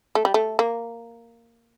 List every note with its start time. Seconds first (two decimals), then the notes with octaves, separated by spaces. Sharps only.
0.15 A3
0.25 G3
0.34 A3
0.59 A#3